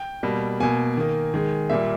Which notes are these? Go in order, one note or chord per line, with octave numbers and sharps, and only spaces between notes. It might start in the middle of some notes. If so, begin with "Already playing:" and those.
Already playing: G5
B2 G3 A#3
B2 A#3 G#5
D#3 A#3
D#3 G#3
A#2 G3 A#3 E5